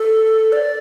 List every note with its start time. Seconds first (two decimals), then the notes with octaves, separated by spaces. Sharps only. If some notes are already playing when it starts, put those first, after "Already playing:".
Already playing: A4
0.52 D5